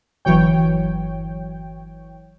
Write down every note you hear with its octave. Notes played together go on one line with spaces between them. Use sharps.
G1 E3 F#3 C#5 G5